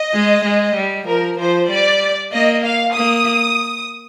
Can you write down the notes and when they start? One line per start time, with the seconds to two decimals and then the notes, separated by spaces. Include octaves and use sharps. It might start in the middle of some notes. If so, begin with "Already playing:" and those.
Already playing: D#5
0.14 G#3
0.45 G#3
0.75 G3
1.07 F3 A#4
1.38 F3 C5
1.70 G3 D5
2.33 A#3 D#5
2.64 F5
2.95 A#3 D#6